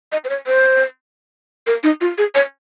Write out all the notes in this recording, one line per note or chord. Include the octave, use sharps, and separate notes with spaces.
D#5
C5
C#5
C5
A#4
D#4
F4
G#4
C#5